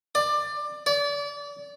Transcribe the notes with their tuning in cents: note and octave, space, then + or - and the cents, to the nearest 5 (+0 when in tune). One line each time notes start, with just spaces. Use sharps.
D5 +20
D5 -30